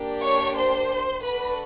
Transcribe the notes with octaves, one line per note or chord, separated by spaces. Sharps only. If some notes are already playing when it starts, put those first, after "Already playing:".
Already playing: A#3 D4 G4
C#5 C#6
C5 C6
D4 F#4 A4 B4 B5